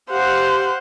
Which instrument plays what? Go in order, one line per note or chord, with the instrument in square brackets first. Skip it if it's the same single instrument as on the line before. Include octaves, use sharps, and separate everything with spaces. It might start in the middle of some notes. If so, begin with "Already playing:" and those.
[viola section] G4 F5 F#5 [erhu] C5